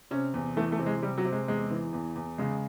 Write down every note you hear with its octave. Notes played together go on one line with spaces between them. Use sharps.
C3 C#4
E2
E3 A3
A3
C3
G#3
C3 G3
F#3
C3
G#3
E2 G#3
E3
E2
E2
C#3 G#3